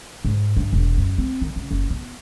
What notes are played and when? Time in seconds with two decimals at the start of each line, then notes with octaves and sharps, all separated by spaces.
0.25 G#2
0.57 G2
0.73 E1
0.98 F#2
1.18 C4
1.41 D#3
1.56 C#3
1.71 F#1
1.90 B3